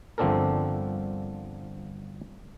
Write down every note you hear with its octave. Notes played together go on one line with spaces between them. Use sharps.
G1 F3 C4 D4 A4 A#4